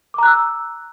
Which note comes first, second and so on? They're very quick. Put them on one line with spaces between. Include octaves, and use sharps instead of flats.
D6 A#5 F#6 E6